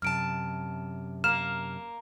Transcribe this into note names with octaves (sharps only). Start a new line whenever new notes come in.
F#2 C3 A5 F6 D7
A#3 F6 E7